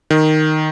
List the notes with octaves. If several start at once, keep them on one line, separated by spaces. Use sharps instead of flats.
D#3